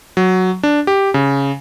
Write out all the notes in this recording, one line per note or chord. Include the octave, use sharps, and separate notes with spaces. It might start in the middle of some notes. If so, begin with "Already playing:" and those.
F#3
D4
G4
C#3